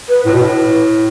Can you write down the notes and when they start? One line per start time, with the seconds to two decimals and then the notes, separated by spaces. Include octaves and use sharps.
0.08 B4
0.25 A2 B4
0.34 B2
0.42 A2